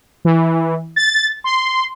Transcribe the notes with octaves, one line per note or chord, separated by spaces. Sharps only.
E3
A6
C6